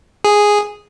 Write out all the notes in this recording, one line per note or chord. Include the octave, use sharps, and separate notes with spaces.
G#4